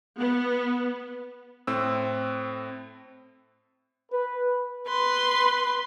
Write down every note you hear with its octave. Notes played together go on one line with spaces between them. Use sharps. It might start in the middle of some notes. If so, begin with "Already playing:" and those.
B3
A2 C4 E6
B4
B4 C6